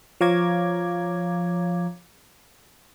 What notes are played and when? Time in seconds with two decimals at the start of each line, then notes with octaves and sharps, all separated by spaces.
0.21 F3 C#5 F5 A#5 D6 G#6